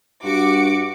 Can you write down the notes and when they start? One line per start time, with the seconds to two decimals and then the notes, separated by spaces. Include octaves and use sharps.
0.24 G2 F#4 D6 C#7